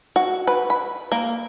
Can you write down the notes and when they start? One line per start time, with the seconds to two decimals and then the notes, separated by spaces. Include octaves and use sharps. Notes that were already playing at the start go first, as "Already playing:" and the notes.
0.16 F#4
0.47 B4
0.70 B5
1.12 A#3